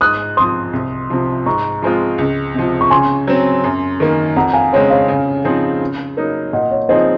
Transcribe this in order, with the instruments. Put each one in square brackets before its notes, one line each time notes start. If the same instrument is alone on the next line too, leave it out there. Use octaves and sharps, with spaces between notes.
[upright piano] G#2 [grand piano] D#6 F#6
[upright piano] F3 C4 [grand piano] C6 D#6
[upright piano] C2
C3 F3
[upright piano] G#2 [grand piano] A#5 C#6
[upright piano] F3 G#3 C4 F4
C#2
C3 F3
[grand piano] C#6
[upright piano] C#3 [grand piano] G#5 C6
[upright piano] F#3 C4
F#2
D#3 A#3
[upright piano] F2 [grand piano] F#5 A#5
[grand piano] F5 G#5
[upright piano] C#3 G#3 C4 [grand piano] C#5
[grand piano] C#5 F5
[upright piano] C#3
F3 C4 D#4 G#4
C#3
F#3 A#3 D#4
[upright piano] A#2 [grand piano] D#5 F#5
[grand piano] C#5
[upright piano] F3 C4 D#4 G#4 [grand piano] C5 D#5